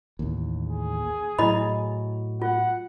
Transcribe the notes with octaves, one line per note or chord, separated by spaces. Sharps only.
A1 D#2
G#4
A2 F#3 E4 D#5 B5
F4 F#5